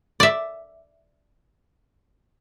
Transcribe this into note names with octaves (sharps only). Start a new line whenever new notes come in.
D5 E5